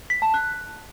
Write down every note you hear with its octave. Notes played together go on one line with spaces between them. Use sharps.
B6
A5
F#6